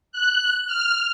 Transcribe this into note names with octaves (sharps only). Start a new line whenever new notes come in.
F#6
F6